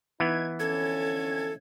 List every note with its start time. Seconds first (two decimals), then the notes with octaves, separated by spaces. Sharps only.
0.20 E3 B3 D#4 G#6
0.60 F2 D3 C#4 A4 G#6